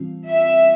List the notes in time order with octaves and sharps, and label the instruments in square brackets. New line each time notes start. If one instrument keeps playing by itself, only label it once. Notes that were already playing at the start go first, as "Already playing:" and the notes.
Already playing: [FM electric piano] A2 E3 G3 C4 F4
[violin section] E5